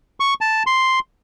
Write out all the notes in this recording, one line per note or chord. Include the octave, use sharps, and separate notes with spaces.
C#6
A5
C6